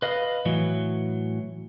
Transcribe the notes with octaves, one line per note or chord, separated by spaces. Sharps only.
B4 D#5 F5
A2 E3 F#3